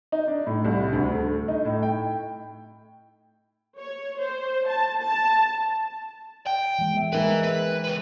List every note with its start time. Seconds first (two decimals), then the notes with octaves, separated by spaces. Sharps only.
0.12 D#4
0.28 D4
0.47 A2
0.65 C2
0.93 D2
1.14 A3
1.48 D#4
1.65 A2
1.83 G5
3.79 C#5
4.22 C5
4.69 A5
5.05 A5
6.47 G5
6.79 E3 G#3
6.94 B3 E5
7.13 G#3 D#4 A#4 B4 E5
7.44 B4
7.84 C#2 B4